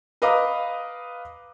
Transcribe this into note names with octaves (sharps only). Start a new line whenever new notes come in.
B4 D#5 F5 A#5 D6 D#6